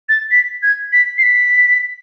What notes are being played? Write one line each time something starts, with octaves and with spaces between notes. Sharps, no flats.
A6
B6
G#6
B6
C7
B6